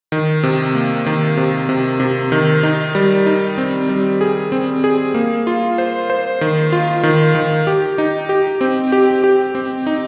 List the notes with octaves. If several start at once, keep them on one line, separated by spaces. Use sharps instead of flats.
D#3
C3
A#3
D#3
C3
C3
C3
D#3
D#4
G3
D#4
C4
G3
G#4
C4
G#4
A#3
F4
C5
C5
D#3
F4
D#3
D#3
G4
D#4
G4
C4
G4
G4
C4
D#4